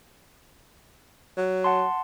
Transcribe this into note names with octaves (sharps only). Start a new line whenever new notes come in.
F#3
F#5 A5 C6